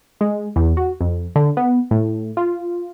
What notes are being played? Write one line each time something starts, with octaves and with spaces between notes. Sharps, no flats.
G#3
E2
F#4
F2
D3
B3
A2
F4